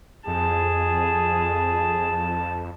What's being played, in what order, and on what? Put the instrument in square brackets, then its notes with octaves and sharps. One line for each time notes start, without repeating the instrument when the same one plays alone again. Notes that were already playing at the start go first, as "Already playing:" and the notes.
[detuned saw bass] F2 [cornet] G#4 [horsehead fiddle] A5